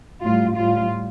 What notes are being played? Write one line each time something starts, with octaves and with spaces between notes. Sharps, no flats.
A2 G3 F4
A2 G3 F4